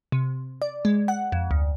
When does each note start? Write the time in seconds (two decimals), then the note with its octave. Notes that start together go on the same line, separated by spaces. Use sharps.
0.12 C3
0.62 D5
0.85 G#3
1.08 F#5
1.32 F2
1.51 D2